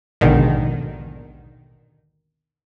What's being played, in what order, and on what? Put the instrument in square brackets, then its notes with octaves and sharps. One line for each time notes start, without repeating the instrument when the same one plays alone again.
[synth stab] A#1 D#2 G#2 B2 D3 D#3